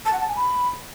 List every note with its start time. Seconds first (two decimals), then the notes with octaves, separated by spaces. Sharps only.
0.05 A5
0.13 F#5
0.21 A5
0.29 G#5
0.36 B5